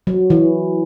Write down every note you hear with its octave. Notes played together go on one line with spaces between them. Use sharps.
F#3
E3